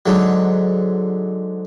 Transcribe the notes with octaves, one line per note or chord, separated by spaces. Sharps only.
G#2 D3 F#3